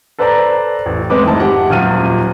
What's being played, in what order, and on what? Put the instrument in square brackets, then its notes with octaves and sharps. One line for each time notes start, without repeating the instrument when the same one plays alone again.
[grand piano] A4 B4 C5 D5 A5 A#5
A1
G#3 C4 B4 D6
G#2 D#3 E4 A5
G4 F#5
D#1 F#2 A#2 F5 F6 D#7